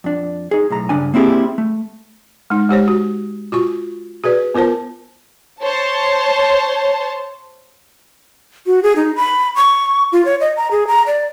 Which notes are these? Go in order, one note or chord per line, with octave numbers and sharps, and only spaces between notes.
F2 D4
D#4 G#4
B1 A2 A#5
G2 C#3 D4 G#5
A#3 C4 E4 G4 G#4
A3
G#3 D#4
G#3 G4 C5 C#5
F#4
F4 F#4 C#6
F#4 G#4 B4 D5
B3 F4 A#4 C5 A5
C5 C#5 A5
F#4
G#4
D#4
B5
C#6
F4
C#5
D#5
A#5
G#4
A#5
D5